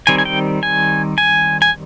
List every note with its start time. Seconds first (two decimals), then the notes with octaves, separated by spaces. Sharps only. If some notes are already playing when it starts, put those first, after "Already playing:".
0.07 D#3 G3 C4 G#5
0.18 G#5
0.25 G5
0.63 G#5
1.18 G#5
1.62 G#5